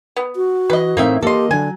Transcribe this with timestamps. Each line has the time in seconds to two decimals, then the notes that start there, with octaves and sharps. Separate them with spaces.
0.16 B3
0.36 F#4
0.70 E3 B4 D#5
0.97 A2 A#3 C4 D#4 E5
1.23 A#3 G4 A4 D#5 C6
1.51 D3 F#3 G#5